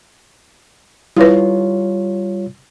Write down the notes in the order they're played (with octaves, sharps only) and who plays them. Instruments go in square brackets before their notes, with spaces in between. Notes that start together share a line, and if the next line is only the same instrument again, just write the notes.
[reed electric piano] G3 F4 C#5 [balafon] E4 B4